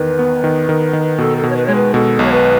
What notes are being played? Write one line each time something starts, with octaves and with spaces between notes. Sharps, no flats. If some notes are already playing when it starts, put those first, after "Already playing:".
Already playing: E2 D#3 B4
B3
D#3
D#3
D#3
B2 A4
A4
B2
C#5
B4
G#3 C#5
B4
B2 A4
B1
C#5
B4